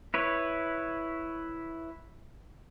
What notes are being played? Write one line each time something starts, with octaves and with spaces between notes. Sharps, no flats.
E4 B4 C#5